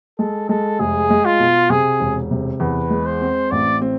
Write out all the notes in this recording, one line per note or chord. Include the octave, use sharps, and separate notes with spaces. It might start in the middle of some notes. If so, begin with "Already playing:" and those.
G#3 A4
G#3 A4
F1 G#4
G#3
F4
B2
C3 G#4
E1
C3
E2 B4
G#3
C5
C4
A1 D5
C4